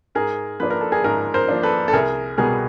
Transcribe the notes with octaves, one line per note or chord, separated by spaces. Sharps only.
G#2 G#4 A#4
F3 A#3 D4 B4
A#4
A4
G#4 A#4
G#2 G#4 A#4
A#4 C5
F3 A#3 D4
A4 B4
A4
C2 G#4 A#4
B2 G3 B3 G#4 A#4